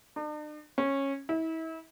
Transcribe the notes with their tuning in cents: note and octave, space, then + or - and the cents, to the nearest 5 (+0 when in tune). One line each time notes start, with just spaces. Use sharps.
D4 +45
C#4 -15
E4 -35